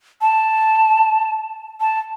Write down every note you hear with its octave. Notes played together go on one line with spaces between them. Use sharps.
A5
A5